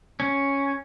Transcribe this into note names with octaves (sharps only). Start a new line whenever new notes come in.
C#4